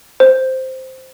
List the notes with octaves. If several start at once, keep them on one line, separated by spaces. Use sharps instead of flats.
C5